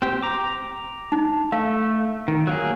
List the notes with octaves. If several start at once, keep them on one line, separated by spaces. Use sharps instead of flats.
C4 G4
A#5 D6
D#4
A3 F5
D#3
F#3 A#3 G#4